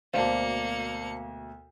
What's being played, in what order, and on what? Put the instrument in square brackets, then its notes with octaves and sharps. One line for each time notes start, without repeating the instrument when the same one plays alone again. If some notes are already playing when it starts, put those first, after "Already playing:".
[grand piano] D2 B2 [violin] A#3 C#7 [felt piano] C5 D5 A5 [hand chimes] F5